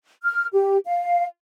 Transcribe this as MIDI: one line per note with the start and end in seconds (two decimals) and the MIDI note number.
0.23 0.47 89
0.53 0.78 67
0.87 1.25 77